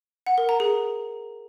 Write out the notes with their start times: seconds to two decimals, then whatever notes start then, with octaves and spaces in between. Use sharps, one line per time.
0.26 F#5
0.38 A#4
0.49 A#5
0.60 G#4